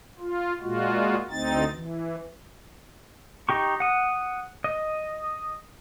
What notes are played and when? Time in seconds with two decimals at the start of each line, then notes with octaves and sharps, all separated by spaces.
0.19 F4
0.61 A#2 G#3 F4 F#4
1.30 D2 C4 D#4 A6
1.72 E3
3.49 D#4 G4 C#6
3.80 F#5 D#6
4.64 D#5